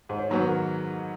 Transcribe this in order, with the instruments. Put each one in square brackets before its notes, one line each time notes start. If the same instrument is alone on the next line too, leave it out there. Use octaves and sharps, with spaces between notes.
[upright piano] G#2 [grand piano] C5
[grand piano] C#5
[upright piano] D#3 F#3 B3 [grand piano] C5
[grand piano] B4
A#4